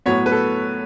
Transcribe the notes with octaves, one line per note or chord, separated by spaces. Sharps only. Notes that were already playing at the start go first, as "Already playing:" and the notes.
A2 F#3 B3 C#5
B4
A4